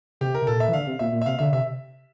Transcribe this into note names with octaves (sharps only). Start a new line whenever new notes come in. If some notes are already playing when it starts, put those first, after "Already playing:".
C3 G4
A#4
C3
A#2 A4
E5
E3
D3 F5
C3
A#2 E5
A#2
E5
C3 F5
D3 E5
C3 E5